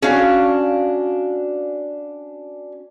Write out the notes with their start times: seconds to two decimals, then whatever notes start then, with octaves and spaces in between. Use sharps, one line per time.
0.03 C#4 D4 F#4 F5